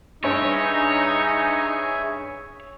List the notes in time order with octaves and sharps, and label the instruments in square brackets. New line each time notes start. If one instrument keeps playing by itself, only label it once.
[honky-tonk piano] G2 C#4 D7 [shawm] D#4 [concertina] G#4 E5 G#5 [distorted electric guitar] C#5